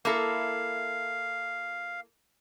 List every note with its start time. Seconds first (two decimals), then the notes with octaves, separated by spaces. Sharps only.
0.05 A#3 E4 A4 F5